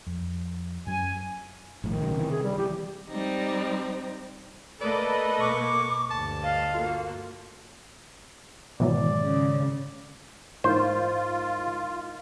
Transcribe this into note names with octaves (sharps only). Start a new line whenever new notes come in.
F2
F#2 F#3 C#4 G#5
A#1 A2 D#3
B1 C#3
C3 E3
G#4
G3
E3 F#3 G3 G4
G3 C4 D#4
A3 A#3 A4 B4 D5 D#5
B2 A#3 C#6 D6
D2 G2 A5
D#5 F5
A#3 F4 F#4 A4
D#2 G#2 B2 E3 F#3 D5
C#3
G#2 E3 A#3 F4 C5